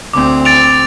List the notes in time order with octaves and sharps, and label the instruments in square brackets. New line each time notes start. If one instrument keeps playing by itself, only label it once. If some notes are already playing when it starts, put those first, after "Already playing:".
[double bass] D2 C4 [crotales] D6
[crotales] A6 D7 F7